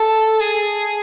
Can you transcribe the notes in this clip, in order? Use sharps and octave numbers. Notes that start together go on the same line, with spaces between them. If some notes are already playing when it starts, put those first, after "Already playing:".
Already playing: A4
G#4